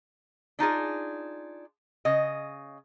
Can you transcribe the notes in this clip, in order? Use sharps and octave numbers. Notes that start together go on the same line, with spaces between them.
D4 D#4 F4 G#4
C#3 D#5